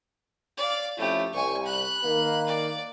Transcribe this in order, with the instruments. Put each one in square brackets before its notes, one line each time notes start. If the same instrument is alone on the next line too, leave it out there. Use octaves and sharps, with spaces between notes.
[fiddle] D5 F5
[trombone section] F2 C#4 E4 [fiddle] A3 G4
[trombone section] C2 [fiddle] G#5 C#6
[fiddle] B5 F#6
[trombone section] D#3 A#3
[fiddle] D5